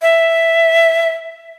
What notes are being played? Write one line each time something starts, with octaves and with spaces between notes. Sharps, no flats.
E5